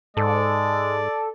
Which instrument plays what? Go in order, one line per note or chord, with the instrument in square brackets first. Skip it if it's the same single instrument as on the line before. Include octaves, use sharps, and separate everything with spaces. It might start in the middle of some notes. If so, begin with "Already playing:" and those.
[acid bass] G#2 [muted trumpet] G#3 [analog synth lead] A4 [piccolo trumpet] D5